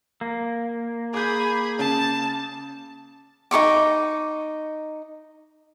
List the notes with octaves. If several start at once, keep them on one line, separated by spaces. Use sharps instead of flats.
A#3
G#4 B5 D6 G6
C#3 A5
D#4 A4 C#6 D6